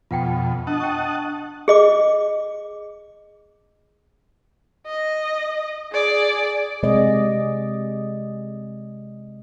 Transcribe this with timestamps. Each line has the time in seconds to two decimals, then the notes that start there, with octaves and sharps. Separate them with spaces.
0.11 F2 B2 F4 F#5 G5
0.67 D4 D#5 F#5 A5
0.80 G5 C#6
1.68 G#4 D#5 D6
4.87 D#5
5.93 G#4 D5
6.83 C3 G#3 G#4 D5 D#5